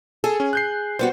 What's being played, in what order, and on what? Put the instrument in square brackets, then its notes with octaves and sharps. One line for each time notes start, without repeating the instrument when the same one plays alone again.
[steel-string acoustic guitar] G#4 [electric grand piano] A4
[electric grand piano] C#4
F#6 G6 C7
[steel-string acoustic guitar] G3 B3 F#4 [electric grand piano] C5